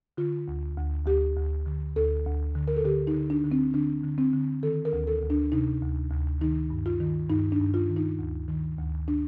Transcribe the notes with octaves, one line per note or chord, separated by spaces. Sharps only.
D3 F4
D2
D2
D2 G4
D2
D3
D2 A4
D2
D3
A#4
A4
D3 G4
D#4
D3
D4
D3
C4
D3 D4
D3
C4
D3
D#3 A4
A#4
D2
A4
D2
D4
C3 D#4
D2
D2
D#3 D#4
G2
F4
D#3
G2 D#4
D4
G2
F4
D#3
D#4
D2
D#3
D2
D4